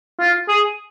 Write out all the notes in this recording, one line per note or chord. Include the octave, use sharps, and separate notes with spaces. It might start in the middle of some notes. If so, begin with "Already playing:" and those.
F4
G#4